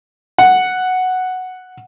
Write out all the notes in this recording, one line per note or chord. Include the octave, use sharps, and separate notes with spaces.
F#5